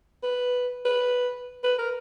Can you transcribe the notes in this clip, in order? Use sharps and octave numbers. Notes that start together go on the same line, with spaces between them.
B4
B4
B4
A#4